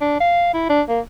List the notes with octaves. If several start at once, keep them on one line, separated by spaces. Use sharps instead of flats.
D4
F5
E4
D4
A#3